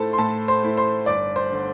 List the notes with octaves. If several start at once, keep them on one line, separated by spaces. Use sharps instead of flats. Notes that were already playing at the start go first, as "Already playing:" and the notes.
Already playing: A2 A3 E4 A4 C5 A5
C6
A2 A4 A5
C5 C6
A3 E4
C5 C6
G1 D5 D6
C5 C6
D3